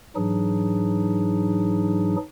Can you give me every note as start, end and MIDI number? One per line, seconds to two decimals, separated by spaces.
0.16 2.16 44
0.16 2.16 52
0.16 2.16 54
0.16 2.16 62
0.16 2.16 63
0.16 2.16 68